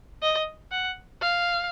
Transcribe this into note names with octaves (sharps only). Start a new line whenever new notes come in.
D#5
F#5
F5